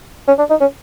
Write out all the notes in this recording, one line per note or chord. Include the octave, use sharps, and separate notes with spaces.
C#4
D4
D#4
C#4